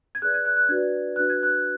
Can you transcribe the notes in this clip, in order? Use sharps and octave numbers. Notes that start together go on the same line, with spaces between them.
G#6
G#4 B4 D5 F#6
G#6
F#6
F#6
D4 F#4 B4 D5 G#6
D4 F#4 B4 F#6
G#6
F#6